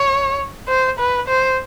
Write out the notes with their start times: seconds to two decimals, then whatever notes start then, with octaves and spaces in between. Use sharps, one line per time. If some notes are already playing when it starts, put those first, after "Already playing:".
Already playing: C#5
0.68 C5
0.99 B4
1.28 C5